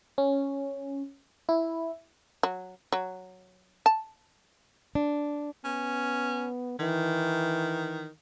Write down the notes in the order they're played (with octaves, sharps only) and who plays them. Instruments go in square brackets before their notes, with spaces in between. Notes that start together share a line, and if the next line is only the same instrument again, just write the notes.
[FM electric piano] C#4
E4
[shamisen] F#3
F#3
A5
[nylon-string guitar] D4
[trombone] B3 [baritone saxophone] C#4
[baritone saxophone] D#3 [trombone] E3